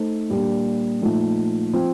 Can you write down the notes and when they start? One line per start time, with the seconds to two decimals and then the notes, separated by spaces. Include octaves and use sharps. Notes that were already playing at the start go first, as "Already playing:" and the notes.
Already playing: A3 D#4 A4 C5
0.29 A#2 G3 A#3 D4
1.01 A#2 F3 A3 D#4
1.73 F3 C4 F4